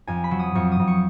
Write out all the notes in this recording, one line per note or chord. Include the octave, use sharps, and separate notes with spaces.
F2 G#5
B5
F#3
D#6
F2 C#6
D#6
F2
C#6